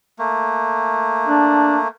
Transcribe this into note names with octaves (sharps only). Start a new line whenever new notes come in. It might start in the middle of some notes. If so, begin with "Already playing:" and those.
A3 A#3
D4